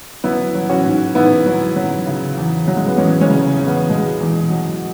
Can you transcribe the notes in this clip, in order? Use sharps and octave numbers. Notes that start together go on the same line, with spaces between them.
F#3 B3 E4
F#3
C#4 F#4
G#2
G#2 B3 E4
F#3
F#3
C#3
E2
F#3
G#3
B3
E2 G#3 C#4
G#3 C#4
C#3
E2
B3
B2 G#3
E2
F#3